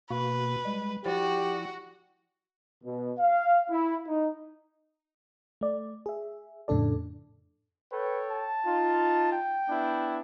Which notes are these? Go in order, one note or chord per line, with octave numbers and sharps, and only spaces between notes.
B2 A#3 F#4 B4
G3 G#3
F3 E4 F#4 G4 D5
B2
F5
E4
D#4
A3 D5
G#4 E5
F2 A2 C#3 D4 A4 D5
A4 B4 C#5 G5
A5
D#4 F4
G5
B3 D4 E4